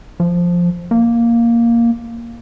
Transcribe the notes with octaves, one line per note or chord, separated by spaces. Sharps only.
F3
A#3